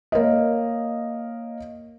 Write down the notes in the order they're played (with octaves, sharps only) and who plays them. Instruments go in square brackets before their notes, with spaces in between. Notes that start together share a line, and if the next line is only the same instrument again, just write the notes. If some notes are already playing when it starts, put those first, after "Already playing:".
[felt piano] A#3 A#4 C#5 D#5